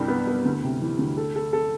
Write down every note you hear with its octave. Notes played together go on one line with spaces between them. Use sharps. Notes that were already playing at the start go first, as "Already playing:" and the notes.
Already playing: C2 G2 G3
B3
B3
D2
C3
E3
D2
A4
A4
A4